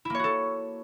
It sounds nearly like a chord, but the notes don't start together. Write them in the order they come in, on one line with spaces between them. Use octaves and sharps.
E4 A#3 C#5 F#4 A4